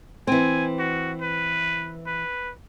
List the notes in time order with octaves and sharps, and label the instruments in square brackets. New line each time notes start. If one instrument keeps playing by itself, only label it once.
[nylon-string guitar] E3 C4 [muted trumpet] G#5
[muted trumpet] F#4
B4
B4